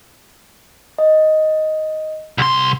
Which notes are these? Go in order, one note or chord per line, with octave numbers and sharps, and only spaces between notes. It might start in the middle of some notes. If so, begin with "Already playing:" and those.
D#5
C2 C6